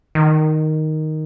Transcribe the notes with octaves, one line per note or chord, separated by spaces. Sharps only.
D#3